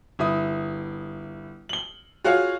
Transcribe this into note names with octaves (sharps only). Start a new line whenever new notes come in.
G1 E4 D#6
F#7 G7
F4 F#4 G#4 C#5 F5